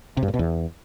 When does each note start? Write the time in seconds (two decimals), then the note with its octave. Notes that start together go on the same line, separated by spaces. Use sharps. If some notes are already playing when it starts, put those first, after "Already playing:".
0.17 C3
0.23 G2
0.28 A2
0.34 B2
0.39 E2